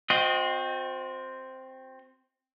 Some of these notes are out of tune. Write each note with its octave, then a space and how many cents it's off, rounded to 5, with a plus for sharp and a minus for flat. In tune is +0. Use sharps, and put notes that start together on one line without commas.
C4 +0 F#4 -40 D#5 +0